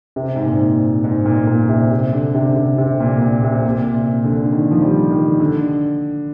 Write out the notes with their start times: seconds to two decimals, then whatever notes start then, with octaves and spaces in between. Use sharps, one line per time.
0.16 C3
0.36 G#2
0.46 A#2
1.04 G#2
1.26 A#2
1.47 A#2
1.69 C3
1.91 C3
2.13 D3
2.35 C3
2.56 C3
2.78 C3
3.00 A#2
3.22 A#2
3.44 C3
3.66 A#2
3.95 C3
4.24 D3
4.52 D#3
4.71 F3
4.82 G3
5.11 D#3
5.40 D3